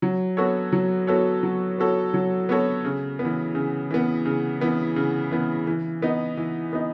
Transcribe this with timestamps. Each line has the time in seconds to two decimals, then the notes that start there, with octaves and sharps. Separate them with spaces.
0.02 F#3
0.37 B3 F#4 A4 C#5
0.72 F#3
1.07 B3 F#4 A4 C#5
1.43 F#3
1.78 B3 F#4 A4 C#5
2.14 F#3
2.49 B3 F#4 A4 C#5
2.85 C#3
3.19 B3
3.25 E3
3.55 C#3
3.91 E3 B3
4.25 C#3
4.61 E3 B3
4.96 C#3
5.31 E3 B3
5.67 E3
6.02 B3 D#4
6.37 E3
6.73 B3 D#4